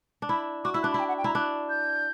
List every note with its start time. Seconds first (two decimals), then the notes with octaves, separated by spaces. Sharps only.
0.22 D4
0.29 E4 B5
0.64 F#4 D6
0.74 E4 E6
0.82 D4 F#6
0.91 B5
0.94 E4
0.99 G5
1.08 F#5
1.18 G5
1.24 E4 A#5
1.35 D4 F#6
1.69 G6